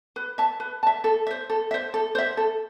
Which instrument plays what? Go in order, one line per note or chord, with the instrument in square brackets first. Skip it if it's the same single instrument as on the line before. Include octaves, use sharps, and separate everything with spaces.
[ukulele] B4
E5 A5
B4
E5 A5
A4
C5 E5
A4
C5 E5
A4
C5 E5
A4